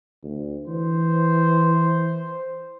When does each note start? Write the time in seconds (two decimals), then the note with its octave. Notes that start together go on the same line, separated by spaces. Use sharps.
0.23 D2
0.68 E3 C5